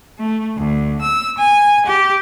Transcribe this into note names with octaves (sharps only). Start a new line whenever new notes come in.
A3
D2
E6
G#5
G4